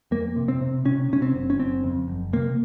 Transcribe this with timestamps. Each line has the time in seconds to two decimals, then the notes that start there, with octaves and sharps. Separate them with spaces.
0.11 F2 A#3
0.36 C3
0.48 C4
0.61 C3
0.85 C3 C#4
1.10 C3 C#4
1.22 C4
1.35 F#1
1.50 C#4
1.59 F#1 C4
1.84 F2
2.08 F#1
2.33 C3 A#3